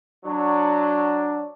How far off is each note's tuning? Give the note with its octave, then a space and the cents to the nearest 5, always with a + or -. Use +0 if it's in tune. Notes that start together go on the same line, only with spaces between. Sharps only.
F#3 +0 D4 +0